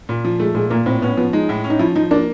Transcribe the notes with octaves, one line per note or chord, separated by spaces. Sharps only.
A#2
F3
G#3 A3
A#2 G#3
A#2 A#3
A2 C4
B3 C#4
F3 B3
G#3 D#4
A2
C#4
D#4
F3 E4
F3 D#4
A#3 D4